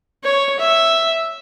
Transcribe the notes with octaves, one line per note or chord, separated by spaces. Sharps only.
C#5
E5